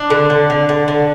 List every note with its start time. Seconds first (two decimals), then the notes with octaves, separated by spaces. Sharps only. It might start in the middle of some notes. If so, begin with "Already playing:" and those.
Already playing: D4
0.10 D3
0.30 D3
0.50 D3
0.69 D3
0.88 D3